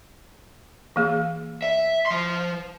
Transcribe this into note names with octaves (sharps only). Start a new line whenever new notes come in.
E3 A#3 G#4
E5
F3 C6